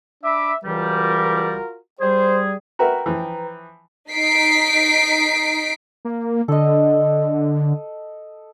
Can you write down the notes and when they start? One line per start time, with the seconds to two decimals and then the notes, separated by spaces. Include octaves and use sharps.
0.24 D4 E5 B5 D6
0.64 C#2 E3 G3 F4 F#4 A#4
2.00 G3 G#4 C5
2.79 F#4 A#4 B4 E5 G5 A#5
3.06 E3 F3
4.11 D#4 B6 C7 D7
6.05 A#3
6.48 D3 A4 D#5